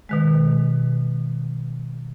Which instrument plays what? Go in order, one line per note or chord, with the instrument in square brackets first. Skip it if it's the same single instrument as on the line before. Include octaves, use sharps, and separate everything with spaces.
[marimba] B2 D#3 G#3